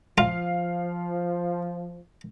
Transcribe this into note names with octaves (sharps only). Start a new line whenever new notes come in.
F3 F4 F5